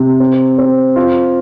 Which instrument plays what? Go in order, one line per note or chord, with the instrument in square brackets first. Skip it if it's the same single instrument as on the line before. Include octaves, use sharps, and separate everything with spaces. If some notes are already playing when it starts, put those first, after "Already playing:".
Already playing: [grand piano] C3
C4
C4
F4